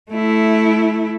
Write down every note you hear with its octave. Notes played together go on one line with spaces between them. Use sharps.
A3 E4